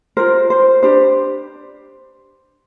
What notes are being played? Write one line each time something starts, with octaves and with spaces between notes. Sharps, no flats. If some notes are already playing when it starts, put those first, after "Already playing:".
F4 A#4 C5
C5
D4 G4 B4 C5